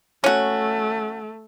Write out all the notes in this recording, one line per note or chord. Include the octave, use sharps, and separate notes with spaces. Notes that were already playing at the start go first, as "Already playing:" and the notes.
A3 C#4 F#4